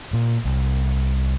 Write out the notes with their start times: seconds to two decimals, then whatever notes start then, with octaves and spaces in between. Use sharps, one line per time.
0.13 A#2
0.45 C2